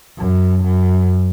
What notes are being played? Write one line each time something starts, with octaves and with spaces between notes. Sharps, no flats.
F#2
F#2